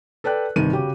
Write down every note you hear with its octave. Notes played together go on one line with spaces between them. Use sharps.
A4 B4 D5 G5 F#6
G1 C3 D#3 D#7
C#3 F#4 G4